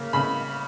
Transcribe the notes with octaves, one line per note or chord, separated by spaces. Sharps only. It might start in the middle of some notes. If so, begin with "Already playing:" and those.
Already playing: C#3 A#3
C#3 B5